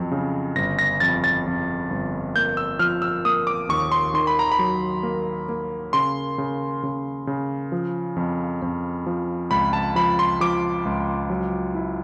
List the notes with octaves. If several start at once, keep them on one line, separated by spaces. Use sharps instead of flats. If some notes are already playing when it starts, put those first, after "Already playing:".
Already playing: F2 F#3
C#3
G1 A#6
A#6
F2 A6
A6
F2
G1
A#3 G6
E6
F3 F6
E6
A#3 D#6
D6
D#2 C#6
C6
D#3 C6
B5
A#5
B5
F#3
A#3
A#3
C#3 C6
C#3
C#3
C#3
F3
F2
F2
F3
C#2 B5
A5
F3 B5
C6
F3 D6
C#2
F#3
E4